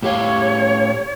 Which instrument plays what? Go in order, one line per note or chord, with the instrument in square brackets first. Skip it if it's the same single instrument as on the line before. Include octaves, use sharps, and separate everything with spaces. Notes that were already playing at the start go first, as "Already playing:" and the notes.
[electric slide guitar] A2 G4 F5 [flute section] C#5